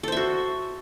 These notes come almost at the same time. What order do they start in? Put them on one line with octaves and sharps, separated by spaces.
A4 C5 E5 F#4